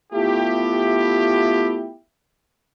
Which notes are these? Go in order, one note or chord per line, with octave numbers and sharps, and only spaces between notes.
A3 B3 E4 F4 G4